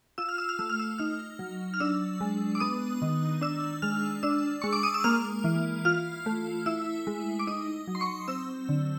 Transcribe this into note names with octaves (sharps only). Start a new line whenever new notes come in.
F4 E6
F6
E6
F6
A3 E6
F6
E6
D#4 F6
F#3
F6
D4 E6
G#3
D6
B3 D#6
D#3
D4 E6
G#3 F6
D4 E6
G#3 C#6
D6
D#6
E6
A#3 F6
E3
F4 F6
A3
E4 E6
G#3
D6
D#4 D#6
F#3
C6
C#6
C4 E6
D3